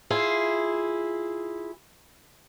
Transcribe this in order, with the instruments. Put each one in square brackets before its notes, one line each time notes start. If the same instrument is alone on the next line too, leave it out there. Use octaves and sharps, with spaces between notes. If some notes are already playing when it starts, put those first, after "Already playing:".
[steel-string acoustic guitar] E4 F4 G#4